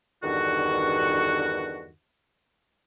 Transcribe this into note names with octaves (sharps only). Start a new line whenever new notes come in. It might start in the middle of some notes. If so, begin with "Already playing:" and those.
E2 G2 D3 D#3 F#4